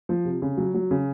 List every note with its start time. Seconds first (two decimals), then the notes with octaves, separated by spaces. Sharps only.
0.09 F3
0.25 C3
0.42 C#3
0.57 F#3
0.74 F#3
0.91 C#3